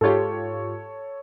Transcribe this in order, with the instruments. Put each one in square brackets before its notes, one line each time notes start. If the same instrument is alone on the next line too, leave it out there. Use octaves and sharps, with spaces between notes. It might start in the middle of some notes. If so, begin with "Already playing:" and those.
[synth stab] G#2 F4 G4 [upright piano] A4 C#5